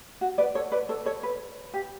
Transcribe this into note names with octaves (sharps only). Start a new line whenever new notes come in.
F#4
B4 D5
A4 C#5
B4 D5
A4 C#5
A4 C#5
B4
G4